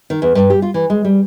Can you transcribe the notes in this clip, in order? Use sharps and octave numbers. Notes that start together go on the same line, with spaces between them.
D#3
E2
G2
G4
F4
E3
G#3
G3